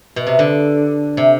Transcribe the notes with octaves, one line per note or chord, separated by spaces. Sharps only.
B2
C3
D3
C3